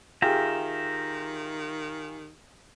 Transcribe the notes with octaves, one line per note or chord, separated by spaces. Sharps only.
D#3 F4 G4 G#4 E5 G5 A#5